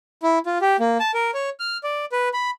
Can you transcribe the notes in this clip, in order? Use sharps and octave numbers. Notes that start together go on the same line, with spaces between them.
E4
F4
G4
A#3
A5
A#4
C#5
F6
D5
B4
B5